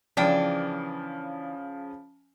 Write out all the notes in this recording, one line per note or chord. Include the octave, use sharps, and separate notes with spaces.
C#3 E3 F3 D4 G5